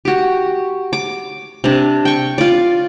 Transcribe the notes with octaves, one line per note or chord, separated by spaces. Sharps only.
F#4 G4
D6
C3 D4
G5 C#6
F4 D5